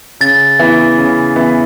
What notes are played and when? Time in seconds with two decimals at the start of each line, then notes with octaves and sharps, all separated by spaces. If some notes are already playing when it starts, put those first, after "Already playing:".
0.20 C#3 A6
0.59 E3 B3 E4 B4
0.98 C#3
1.36 E3 B3 E4 B4